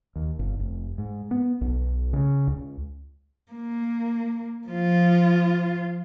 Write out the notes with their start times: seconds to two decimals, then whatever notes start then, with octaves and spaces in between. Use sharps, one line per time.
0.16 D#2
0.39 G1
0.59 F1
0.98 G#2
1.31 B3
1.61 B1
2.13 C#3
2.47 C#2
3.52 A#3
4.68 F3 F4